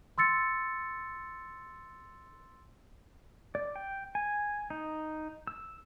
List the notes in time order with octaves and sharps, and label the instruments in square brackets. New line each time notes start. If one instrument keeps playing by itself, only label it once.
[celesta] C6 E6 A6 C#7
[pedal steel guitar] D5
G5
G#5
D#4
E6